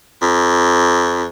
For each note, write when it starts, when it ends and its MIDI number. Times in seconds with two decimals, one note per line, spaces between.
0.22 1.25 41